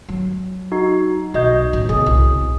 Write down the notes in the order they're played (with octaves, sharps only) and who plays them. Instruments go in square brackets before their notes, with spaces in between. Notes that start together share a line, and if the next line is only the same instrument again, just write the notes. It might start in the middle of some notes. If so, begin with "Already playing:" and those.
[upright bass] F#3
[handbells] D#4 F#4
[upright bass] B1 [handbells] F#4 D#5 G6
[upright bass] A1
[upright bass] C#3 B3 [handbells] G#4
[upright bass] C2